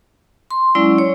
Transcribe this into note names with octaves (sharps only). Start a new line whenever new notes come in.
C6
F#3 G#3 C#4 E4 D5 C#6
C#5